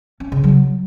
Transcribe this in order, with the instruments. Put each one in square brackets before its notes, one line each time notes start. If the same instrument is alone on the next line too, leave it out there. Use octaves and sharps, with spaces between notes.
[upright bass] C#4
C#3
F#3